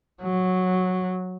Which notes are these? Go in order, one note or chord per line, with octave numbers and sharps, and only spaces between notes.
F#3